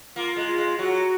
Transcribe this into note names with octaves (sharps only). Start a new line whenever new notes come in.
A#3 F4
G#3
F4
G#3
F#3 F#4